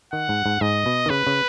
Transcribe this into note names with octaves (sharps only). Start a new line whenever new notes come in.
D#3 F#5
G#2
G#2
G#2 D#5
B2
D#3
C#3 B4
C#3